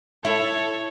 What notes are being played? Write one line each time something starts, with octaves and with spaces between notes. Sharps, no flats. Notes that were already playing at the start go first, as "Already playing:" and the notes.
E4 A4 C#5 E5